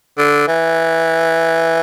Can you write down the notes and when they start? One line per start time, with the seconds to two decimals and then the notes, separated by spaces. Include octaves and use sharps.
0.18 D3
0.48 E3